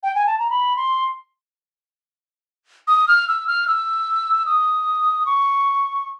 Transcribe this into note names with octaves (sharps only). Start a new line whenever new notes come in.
G5
G#5
A5
A#5
B5
C6
D#6
F6
E6
F6
E6
D#6
C#6